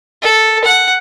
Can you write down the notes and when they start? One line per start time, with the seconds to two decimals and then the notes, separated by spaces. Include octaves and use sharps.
0.22 A4
0.64 F#5